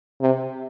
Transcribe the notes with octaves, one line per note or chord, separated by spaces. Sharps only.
C3